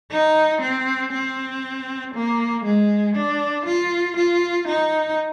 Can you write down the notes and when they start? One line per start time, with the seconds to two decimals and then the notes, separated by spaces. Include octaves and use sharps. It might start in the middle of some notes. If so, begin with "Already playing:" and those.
0.12 D#4
0.62 C4
1.13 C4
2.15 A#3
2.64 G#3
3.16 D4
3.66 F4
4.17 F4
4.68 D#4